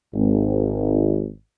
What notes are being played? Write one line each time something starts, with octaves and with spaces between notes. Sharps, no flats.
G#1